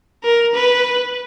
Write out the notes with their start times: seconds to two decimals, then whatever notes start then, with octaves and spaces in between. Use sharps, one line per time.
0.24 A#4
0.55 B4